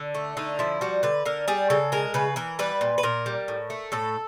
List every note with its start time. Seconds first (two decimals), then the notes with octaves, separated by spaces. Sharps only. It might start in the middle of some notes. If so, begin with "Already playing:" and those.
Already playing: D3
0.14 A3
0.37 D3 D#4
0.59 F3 E4
0.81 G3 F#4
1.03 D3 B4
1.25 D3 A#4
1.48 G3 G#4
1.70 C#3 A4
1.92 G#3 A#4
2.14 C#3 B4
2.36 E3 A#4
2.59 G3 B4
2.81 A#2
2.98 B4
3.03 A#2 A#4
3.26 G3
3.48 A2
3.70 A3
3.92 A2 A4